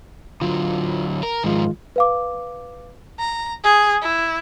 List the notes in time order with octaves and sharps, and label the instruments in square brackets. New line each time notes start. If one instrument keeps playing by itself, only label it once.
[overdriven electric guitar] D3 F#3 [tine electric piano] F4
[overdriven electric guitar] A#4
[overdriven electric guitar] G#2 F3 [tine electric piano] D#3 G#3 F4
[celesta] B4 F5 D6
[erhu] A#5
G#4
E4